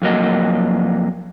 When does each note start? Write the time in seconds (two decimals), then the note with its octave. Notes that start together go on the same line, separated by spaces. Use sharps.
0.02 F2 F#3 A#3 D#5